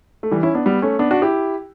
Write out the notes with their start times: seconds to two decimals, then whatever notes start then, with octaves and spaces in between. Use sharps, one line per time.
0.23 A3
0.31 E3 G3
0.43 C#4 E4
0.55 B3 D4
0.66 G3 B3
0.82 A3 C#4
0.99 B3 D4
1.11 D4 F#4
1.22 E4 G4